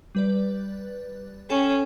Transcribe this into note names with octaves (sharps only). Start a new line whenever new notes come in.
G3 B4 D5
C#4 A4 G5